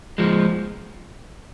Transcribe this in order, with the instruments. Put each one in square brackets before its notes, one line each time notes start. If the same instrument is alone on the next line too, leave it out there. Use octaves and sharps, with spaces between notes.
[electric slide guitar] F3 G#3